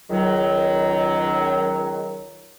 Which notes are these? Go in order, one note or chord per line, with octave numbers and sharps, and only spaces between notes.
C#2 D#3 F#3